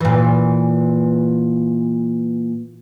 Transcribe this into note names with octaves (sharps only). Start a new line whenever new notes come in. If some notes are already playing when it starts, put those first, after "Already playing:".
A#2 E3